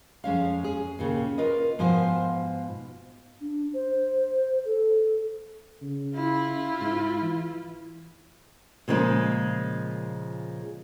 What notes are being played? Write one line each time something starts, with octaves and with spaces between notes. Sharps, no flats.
F2 G#3 C#4 F5
G#4
D#2 A#2 C#3
F4 A#4 B4 D#5
G#2 B2 F3 F4 C5 G#5
D4
C5
A4
C#3
E4 F4
G#2
E3
A#2 C#3 F3 G#3 A#3